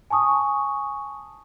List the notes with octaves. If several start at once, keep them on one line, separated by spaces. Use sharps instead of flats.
G#5 A5 C#6 D#6